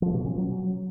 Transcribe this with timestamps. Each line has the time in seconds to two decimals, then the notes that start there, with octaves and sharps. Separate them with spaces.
0.02 F3
0.14 B2
0.26 C#4
0.38 F#3